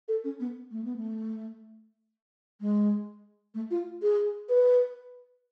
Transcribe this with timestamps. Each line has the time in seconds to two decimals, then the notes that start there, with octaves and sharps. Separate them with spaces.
0.08 A4
0.24 C#4
0.40 B3
0.71 A3
0.84 B3
0.96 A3
2.61 G#3
3.54 A3
3.71 F4
4.02 G#4
4.49 B4